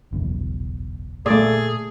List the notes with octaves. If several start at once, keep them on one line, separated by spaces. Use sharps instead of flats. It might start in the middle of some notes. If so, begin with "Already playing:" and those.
F#1 B1 E2
A#2 A3 G#4 D5